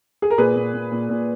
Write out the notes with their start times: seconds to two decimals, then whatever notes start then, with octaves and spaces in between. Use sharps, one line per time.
0.22 G#4
0.30 A#4
0.38 A#2 G#4 B4
0.56 A#2
0.74 A#2
0.92 A#2
1.09 A#2